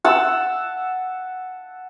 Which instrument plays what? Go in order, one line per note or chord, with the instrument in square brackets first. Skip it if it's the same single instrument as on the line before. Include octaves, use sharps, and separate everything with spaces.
[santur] F#5 A5 E6